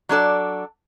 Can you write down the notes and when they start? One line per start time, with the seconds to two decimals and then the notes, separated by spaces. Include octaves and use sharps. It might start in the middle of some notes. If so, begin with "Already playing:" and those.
0.09 F#3 D4 A4 D5